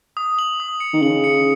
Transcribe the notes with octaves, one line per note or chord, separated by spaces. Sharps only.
D#6
F#7
D#6
C#7
D#3
C#3 F#7
C#7